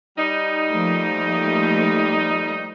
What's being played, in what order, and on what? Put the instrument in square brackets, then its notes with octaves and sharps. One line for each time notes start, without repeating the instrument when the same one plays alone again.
[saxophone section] G3 D#4
[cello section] F3 A3 A#3